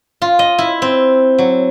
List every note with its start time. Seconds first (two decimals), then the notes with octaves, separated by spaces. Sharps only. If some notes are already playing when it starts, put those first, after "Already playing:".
0.22 F4
0.39 D#5
0.58 E4
0.82 C4
1.38 F#3